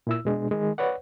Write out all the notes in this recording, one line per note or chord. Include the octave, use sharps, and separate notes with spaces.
A#2 E4 E6
B2 G#3 D4
D#3 G#3
B4 C#5 D5 F#5